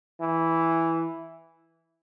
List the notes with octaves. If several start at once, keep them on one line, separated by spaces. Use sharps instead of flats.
E3